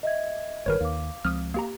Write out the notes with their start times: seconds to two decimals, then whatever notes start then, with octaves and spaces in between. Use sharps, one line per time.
0.03 D#5 E5 G#6
0.66 G#1 G2 D#3 A#4 B4 C#5
0.81 D#2 F5 D6
1.25 C#2 F3 C4 D#6 F6
1.54 A#3 G4 A#5